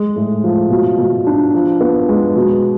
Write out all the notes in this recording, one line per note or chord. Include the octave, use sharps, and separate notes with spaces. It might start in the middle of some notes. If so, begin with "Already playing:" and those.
Already playing: G#3
A2
F3
B2
B2
D4
F3
B3
G#3
B2